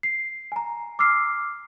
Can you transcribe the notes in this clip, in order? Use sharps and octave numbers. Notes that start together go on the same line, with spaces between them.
C7
G#5 A#5
D6 E6 F6 C7